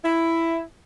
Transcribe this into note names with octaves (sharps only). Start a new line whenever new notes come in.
E4